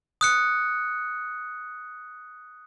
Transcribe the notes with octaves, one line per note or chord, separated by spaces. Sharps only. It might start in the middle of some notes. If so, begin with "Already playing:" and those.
D#6 F#6 C#7